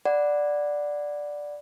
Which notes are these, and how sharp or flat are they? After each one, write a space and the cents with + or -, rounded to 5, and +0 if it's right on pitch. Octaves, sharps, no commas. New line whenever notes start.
D5 +0 F#5 -5 B5 +0